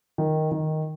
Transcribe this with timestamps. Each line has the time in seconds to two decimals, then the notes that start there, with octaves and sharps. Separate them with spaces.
0.18 D#3
0.52 D#3